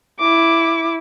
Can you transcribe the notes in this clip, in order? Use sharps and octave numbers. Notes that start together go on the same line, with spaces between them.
E4 D6